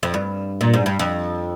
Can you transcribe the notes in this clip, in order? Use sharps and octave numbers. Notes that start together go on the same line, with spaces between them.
F2
G2
A#2
G#2
G2
F2